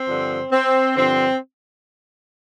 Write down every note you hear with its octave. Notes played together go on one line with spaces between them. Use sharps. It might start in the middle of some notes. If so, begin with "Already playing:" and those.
Already playing: C4
G2 D3 F3
C4
G2 D3 F3 C4